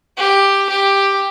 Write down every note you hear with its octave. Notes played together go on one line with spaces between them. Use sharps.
G4
G4